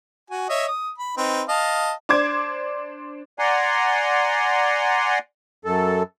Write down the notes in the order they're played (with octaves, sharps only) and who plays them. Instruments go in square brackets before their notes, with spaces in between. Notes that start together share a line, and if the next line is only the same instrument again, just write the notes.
[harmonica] F#4 G#5
C#5 D#5 E5
D#6
B5
C4 D#4 B4
D#5 F5 A5
[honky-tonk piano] D4 C5 D6 G#6
[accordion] D5 F#5 G#5 A#5 C6
F#2 A4